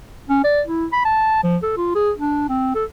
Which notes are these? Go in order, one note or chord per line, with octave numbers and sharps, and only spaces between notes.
C#4
D5
E4
B5
A5
F3
A4
F4
G#4
D4
C4
A4